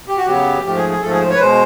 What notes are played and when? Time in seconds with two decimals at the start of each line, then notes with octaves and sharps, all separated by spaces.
0.08 G4
0.17 F#4
0.26 C#3 F#3 B3 G4
0.64 G#2 F3 A3 G4
0.76 G#4
0.89 G#4
1.02 G#2 F3 A3 A4
1.11 G#4
1.20 C5
1.30 C#5
1.35 B4
1.39 B2 G#3 C5